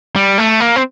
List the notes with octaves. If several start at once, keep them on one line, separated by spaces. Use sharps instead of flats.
G3
A3
A#3
C4